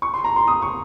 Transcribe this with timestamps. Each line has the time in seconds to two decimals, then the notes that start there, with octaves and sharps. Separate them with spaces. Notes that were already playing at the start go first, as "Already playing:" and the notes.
0.02 C#6
0.14 C6
0.24 A#5
0.36 C6
0.48 D#6
0.62 C#6